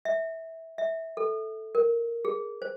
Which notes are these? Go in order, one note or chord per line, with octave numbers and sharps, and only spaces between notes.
E5
E5
A4
A#4
G#4
C5